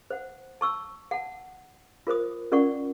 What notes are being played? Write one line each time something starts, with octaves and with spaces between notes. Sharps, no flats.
C5 F#5
A5 C#6 E6
F#5 A5
F4 A#4 C5 D#6
C#4 F4 A#4 D5 F#5 C#6